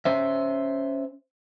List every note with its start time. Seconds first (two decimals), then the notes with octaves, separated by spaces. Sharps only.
0.05 C#4 C5 E5